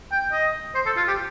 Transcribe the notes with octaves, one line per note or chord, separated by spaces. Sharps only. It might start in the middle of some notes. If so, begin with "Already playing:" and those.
G5
D#5
C5
A4
F4
G4